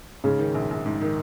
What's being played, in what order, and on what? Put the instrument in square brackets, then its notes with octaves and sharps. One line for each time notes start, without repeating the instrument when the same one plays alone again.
[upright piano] G#2 [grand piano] C#3
[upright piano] D#3
A#1
A#1
G#2
D#3